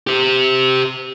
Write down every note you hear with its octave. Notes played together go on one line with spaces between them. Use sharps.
G4 C5